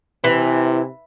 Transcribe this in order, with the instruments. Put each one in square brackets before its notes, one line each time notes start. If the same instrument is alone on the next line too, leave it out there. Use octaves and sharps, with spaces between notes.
[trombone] C3 [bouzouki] E3